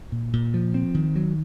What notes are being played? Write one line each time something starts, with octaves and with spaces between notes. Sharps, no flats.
A#2
A#2
F3
C4
D#3
F#3